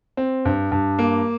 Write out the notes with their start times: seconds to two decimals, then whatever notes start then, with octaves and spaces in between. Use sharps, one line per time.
0.17 C4
0.45 G2
0.72 G2
0.99 A#3